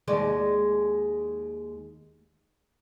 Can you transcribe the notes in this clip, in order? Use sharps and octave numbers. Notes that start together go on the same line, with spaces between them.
D#2 G#3 D5